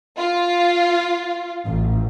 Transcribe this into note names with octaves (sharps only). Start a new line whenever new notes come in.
F4
A1